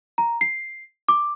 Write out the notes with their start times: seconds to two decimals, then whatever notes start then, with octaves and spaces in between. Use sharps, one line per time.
0.18 A#5
0.41 C7
1.08 D6